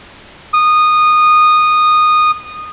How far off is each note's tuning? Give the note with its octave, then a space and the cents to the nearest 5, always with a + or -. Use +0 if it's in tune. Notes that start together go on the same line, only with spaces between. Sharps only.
D#6 -15